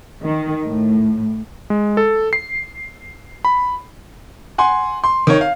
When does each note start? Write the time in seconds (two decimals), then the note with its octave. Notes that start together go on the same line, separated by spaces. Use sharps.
0.23 D#3
0.65 A2
1.70 G#3
1.97 A4
2.33 C7
3.45 B5
4.58 F#5 G#5 C6
5.04 C6
5.27 D#3 C#5
5.41 F5